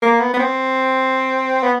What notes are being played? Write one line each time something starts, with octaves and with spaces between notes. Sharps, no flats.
A#3
B3
B3
C4
B3